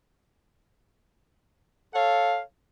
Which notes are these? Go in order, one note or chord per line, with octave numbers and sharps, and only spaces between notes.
A4 C#5 F5